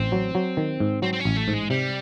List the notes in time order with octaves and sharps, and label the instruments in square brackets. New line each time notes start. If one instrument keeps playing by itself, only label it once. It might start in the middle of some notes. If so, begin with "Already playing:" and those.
Already playing: [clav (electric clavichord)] A1 [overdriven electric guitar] C4
[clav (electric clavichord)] F#3
F#3
D#3
G#2
[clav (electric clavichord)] F#3 [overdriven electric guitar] C4
[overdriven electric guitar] C4
C#4
[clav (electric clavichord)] A1
[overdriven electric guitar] A3
[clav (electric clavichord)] G#2
[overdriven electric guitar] G#3
[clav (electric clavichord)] C3 [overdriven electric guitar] G3